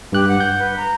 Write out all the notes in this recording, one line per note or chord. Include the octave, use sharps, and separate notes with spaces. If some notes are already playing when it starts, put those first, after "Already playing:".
G2 G4 F#6
F#5
G6
B4
A#5